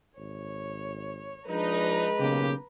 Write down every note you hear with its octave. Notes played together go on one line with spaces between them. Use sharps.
G#1 C#5
F3 G#3 D4 D#4 B4 A#5
B1 C#3 A#3 G4